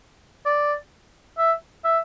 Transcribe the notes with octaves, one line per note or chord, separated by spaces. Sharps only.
D5
E5
E5